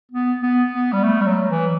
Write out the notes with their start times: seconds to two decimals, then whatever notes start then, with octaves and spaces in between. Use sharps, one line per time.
0.11 B3
0.43 B3
0.73 B3
0.93 G3
1.04 A3
1.21 G3
1.26 F#3
1.50 E3